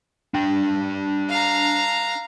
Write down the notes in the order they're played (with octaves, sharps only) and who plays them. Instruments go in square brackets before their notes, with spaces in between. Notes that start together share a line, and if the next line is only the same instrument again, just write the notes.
[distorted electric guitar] D4 G5
[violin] F5 A#5